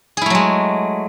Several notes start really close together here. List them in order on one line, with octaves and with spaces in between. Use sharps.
G#4 E4 A3 F#3 G#3